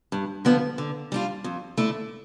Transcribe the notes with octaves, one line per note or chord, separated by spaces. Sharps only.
G2
D3 F3 B3
D3
G3 D4 F4
F2
D3 A3 E4